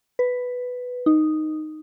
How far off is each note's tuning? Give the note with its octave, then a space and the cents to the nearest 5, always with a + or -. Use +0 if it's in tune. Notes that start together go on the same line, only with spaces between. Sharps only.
B4 +5
D#4 -5